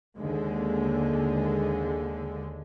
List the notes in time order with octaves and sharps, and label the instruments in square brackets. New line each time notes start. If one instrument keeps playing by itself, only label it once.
[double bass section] D#2 D3 G#3